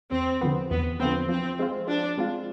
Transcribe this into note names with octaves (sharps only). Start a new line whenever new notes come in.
E2 C4
D3 F3 B3
E2 B3
D3 F3 B3 C4
F3 C4
G#3 C4 F4
F3 D4
G#3 C4 F4